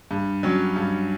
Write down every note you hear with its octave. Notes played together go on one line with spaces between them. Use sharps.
G2
F#3 C#4
G2